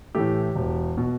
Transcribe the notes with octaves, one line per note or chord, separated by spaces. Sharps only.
A2 E3 A3 G4
E1
B2